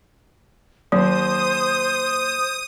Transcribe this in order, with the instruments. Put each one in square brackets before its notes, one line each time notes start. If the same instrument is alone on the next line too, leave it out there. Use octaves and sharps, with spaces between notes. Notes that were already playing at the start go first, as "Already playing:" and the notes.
[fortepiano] D#2 [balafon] F#3 [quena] C5 [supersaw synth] D#6